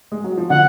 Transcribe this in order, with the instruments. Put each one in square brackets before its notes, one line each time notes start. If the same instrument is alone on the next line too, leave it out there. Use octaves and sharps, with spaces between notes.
[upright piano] G#3
F#3
F3
[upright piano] D3 [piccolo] F#5